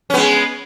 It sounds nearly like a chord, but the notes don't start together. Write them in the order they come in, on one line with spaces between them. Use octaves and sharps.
C#4 B3 G#3